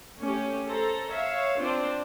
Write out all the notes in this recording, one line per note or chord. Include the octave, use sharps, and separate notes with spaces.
A3 C#4 G4
A4 C5 A#5
C#5 E5 F5
C4 D4 F4 C5 D5